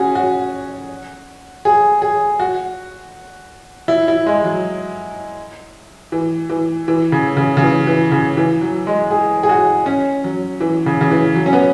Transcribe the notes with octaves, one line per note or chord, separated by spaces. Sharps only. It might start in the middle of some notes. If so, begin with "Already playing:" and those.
Already playing: C#4 F#4 G#4
F#4
G#4
G#4
F#4
E4
E4
G#3
F#3
E3
E3
E3
C#3
C#3
C#3
E3
E3
C#3
E3
F#3
G#3
G#4
G#4
F#4
C#4
F#3
E3
C#3
C#3
E3
F#3
C#4
B3